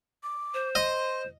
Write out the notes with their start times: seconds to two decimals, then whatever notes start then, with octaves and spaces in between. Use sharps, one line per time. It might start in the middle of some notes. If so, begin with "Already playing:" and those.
0.23 D6
0.54 C5
0.75 D#5 C6